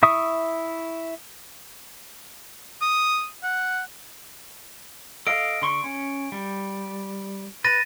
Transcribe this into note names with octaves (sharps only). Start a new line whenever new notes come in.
E4 E5 C#6 D#6
D#6
F#5
A4 D#5 F5 D7
D3 C6 C#6
C#4
G3
B4 A6 A#6 D#7